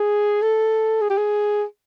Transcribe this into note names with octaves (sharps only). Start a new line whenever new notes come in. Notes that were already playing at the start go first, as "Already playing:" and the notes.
Already playing: G#4
A4
G#4
G4
G#4